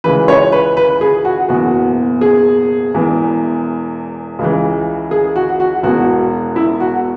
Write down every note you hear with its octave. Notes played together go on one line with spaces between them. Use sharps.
C#2 C#3 E3 B4
C#5
B4
B4
G#4
F#4
F#1 E2 B2 F#4
G#4
E1 E2 E3
C#2 C#3 E3
G#4
F#4
F#4
E1 E2 B2 F#4
E4
F#4